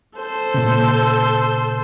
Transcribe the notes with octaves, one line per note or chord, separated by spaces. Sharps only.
A4 C5
A#2 C#3